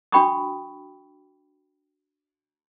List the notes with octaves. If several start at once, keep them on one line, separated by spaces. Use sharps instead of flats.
D4 F#4 G5 B5 C#6 D#6